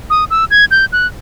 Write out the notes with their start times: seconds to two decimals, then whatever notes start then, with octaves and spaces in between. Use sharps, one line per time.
0.10 D#6
0.30 E6
0.51 G#6
0.71 G6
0.92 F#6